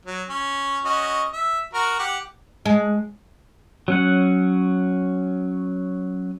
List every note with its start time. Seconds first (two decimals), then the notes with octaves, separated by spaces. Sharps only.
0.05 F#3
0.29 C#4
0.85 C#4 F#4 D#5
1.33 E5
1.74 F#4 A#4
1.99 G4 F#5
2.66 G#3
3.88 F#3 C#4 F#5